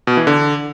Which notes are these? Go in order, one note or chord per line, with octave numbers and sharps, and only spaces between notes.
B2
E3
D3